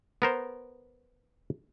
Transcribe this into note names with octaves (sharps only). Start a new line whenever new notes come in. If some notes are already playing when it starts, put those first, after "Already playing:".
B3 A#4 C5